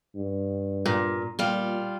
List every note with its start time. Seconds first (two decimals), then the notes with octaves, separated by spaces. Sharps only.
0.16 G2
0.86 A#2
1.39 A#2 G3 F4